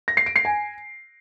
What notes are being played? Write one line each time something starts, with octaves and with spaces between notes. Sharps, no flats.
A#6
C7
D7
C7
G#5